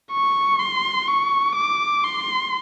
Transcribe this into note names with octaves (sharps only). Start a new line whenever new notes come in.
C#6
C6
C#6
D6
C6